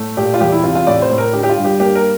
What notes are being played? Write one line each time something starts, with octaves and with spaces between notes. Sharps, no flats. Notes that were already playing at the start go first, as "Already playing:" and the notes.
Already playing: A2 A3
A#2 G4
F4
E2 G4
E4
C3 F4
F4
A2 D5
C5
A2
A#4
D3 G4
G4
F4
G2
G4
A#3 G4
A#4